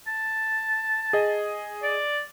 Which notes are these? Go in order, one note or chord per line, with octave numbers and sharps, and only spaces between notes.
A5
G#4 D#5
D5